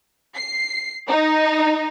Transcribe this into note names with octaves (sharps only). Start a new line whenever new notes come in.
C7
D#4